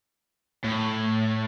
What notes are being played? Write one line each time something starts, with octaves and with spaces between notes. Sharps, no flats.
A2